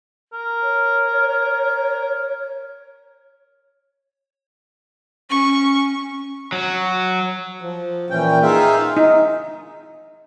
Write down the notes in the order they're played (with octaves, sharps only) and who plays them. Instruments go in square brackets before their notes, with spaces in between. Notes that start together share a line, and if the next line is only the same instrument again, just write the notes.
[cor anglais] A#4
[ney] C#5
[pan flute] C#4 [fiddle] C#6
[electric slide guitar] F#3
[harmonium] F3
A#2 E3 C#4 G5
D#4 F4 G#4 E5 F5
[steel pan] D#4